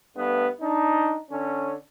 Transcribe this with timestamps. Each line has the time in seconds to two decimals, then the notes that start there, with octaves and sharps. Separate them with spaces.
0.16 G2 A3 B3
0.61 D4 D#4
1.30 D3 C#4